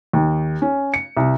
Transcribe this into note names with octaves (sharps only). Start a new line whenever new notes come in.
D#2
C#4
C#7
C2